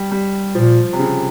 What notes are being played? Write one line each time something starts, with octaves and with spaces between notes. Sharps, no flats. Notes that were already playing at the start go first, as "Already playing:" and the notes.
Already playing: G3
G3
A#2 F3
C3
C#3